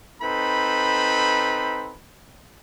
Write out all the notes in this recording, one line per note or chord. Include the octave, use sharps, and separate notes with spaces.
C4 D#4 A4 B4 B5